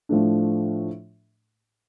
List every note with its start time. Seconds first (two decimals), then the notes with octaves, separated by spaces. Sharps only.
0.09 A2 F3 A3 D4